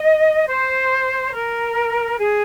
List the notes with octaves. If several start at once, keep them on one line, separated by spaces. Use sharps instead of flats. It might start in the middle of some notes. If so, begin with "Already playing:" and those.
Already playing: D#5
C5
A#4
G#4